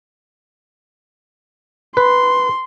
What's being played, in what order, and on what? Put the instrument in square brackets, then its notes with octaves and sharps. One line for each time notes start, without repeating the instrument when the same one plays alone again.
[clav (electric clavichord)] B4 [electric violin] C6